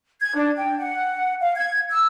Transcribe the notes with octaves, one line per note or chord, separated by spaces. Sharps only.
G#6
D4
G5
F#5
F5
G#6
E6